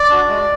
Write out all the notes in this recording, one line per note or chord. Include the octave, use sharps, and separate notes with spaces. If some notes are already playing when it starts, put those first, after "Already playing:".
Already playing: D5
D4 F#4
G#3